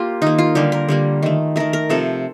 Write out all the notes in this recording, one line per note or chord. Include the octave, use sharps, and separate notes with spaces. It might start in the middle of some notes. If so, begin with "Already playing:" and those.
Already playing: A#3 F4 G4
D#3 A#3 D#4
F4
D3 G3 A#3 G4
A#4
D3 G3 A#3
D#3 A3
D#3 A3 A#4
A#4
C3 F3 A3 A4